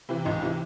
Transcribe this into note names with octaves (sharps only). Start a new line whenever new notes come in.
C3 E3
C#2 D#4
C3 E3 D#4